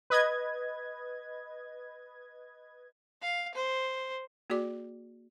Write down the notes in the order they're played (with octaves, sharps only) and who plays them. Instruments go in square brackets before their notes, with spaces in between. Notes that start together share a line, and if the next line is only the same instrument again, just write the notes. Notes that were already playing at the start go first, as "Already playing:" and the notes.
[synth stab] B4 D#5 G#6
[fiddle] F5
C5
[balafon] A#3 F#4 G#4 D5 D6